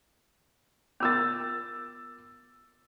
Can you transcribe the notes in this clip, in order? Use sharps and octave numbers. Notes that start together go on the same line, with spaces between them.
B3 F4 A#4 D6 E6 A6